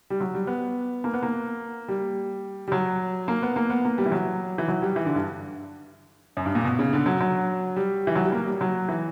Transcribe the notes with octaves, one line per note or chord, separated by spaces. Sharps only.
G3
F#3
G3
B3
A#3
B3
A#3
G3
G3
F#3
A#3
B3
A#3
B3
A#3
G3
E3
F#3
E3
F#3
G3
E3
D3
G2
F#2
G2
A#2
B2
C#3
D3
F#3
F#3
G3
E3
F#3
G3
A#3
G3
F#3
E3